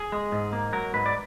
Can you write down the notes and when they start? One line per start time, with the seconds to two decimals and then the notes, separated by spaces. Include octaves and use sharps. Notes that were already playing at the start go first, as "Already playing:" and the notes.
Already playing: G#4
0.12 G#3
0.32 G#2
0.53 A#3
0.73 F#3 A#4
0.94 G#2 B4
1.06 D5